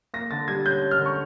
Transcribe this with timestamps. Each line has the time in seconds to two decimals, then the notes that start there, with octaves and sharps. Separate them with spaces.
0.14 A#3 A#6
0.31 D3 A6
0.48 G3 G#6
0.66 C#4 G6
0.82 C#4
0.91 F6
0.99 D3
1.06 C#6